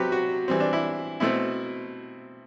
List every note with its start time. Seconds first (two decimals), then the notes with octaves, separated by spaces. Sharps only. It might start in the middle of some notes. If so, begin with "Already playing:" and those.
Already playing: C3 F#3 C4 G4 B4
0.12 F#4
0.48 E3 G3 C4
0.60 D4
0.73 E4
1.20 B2 A3 C4 E4